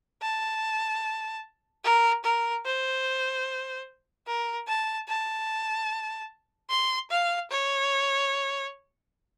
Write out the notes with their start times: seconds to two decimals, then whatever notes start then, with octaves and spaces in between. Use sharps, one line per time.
0.22 A5
1.84 A#4
2.24 A#4
2.65 C5
4.27 A#4
4.68 A5
5.08 A5
6.70 C6
7.11 F5
7.51 C#5